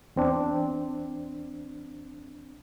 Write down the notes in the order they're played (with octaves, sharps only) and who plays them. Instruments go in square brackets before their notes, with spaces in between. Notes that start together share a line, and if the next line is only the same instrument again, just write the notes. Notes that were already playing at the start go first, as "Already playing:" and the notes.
[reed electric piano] E2 C4 D4